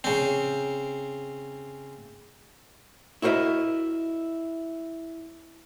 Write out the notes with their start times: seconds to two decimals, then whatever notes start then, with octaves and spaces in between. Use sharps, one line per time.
0.04 C#3 C4
3.22 E4 F#4 A#4 C5 D#5 E5